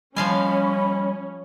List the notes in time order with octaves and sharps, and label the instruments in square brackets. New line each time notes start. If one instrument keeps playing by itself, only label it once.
[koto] F3 F5 G#5 [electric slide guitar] G3 D#5 [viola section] C#4 [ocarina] B5